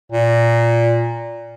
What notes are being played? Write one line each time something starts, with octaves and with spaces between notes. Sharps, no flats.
A#2